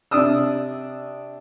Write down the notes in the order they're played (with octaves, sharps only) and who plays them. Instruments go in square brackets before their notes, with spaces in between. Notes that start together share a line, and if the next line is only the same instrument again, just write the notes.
[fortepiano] C3 D4 D5 D#6 E6